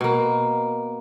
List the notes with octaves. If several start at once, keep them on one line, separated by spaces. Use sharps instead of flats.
B2 A#3